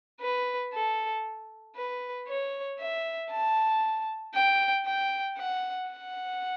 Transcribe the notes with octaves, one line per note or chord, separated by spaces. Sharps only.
B4
A4
B4
C#5
E5
A5
G5
G5
F#5
F#5